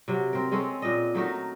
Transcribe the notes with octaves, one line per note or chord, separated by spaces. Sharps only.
C3 F#3
C4 A#4
G#3 C4 C#4 A4
A#2 D#5
F#3 A3 D#4 A#4